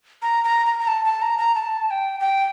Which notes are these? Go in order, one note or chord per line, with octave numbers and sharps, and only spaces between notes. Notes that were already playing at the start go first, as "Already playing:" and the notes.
A#5
A#5
A#5
A#5
A5
A5
A#5
A#5
A5
A5
G5
G5